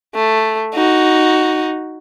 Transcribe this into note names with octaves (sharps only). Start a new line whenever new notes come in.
A3
D#4 F#4